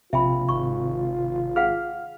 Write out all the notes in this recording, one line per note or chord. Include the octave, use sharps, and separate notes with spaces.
A#1 C3 F4 E5 G5 B5
G#1 C#6
G#4 F5 F#5 F6